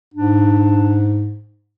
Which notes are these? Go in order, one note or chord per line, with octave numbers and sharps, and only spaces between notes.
G#2 D4